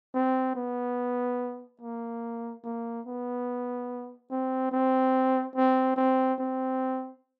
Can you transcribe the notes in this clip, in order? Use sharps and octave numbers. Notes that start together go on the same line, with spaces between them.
C4
B3
A#3
A#3
B3
C4
C4
C4
C4
C4